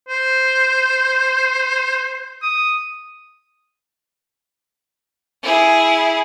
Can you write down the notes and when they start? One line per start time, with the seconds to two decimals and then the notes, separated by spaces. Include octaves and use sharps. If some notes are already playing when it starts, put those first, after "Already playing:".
0.09 C5
2.43 D#6
5.43 E4 G#4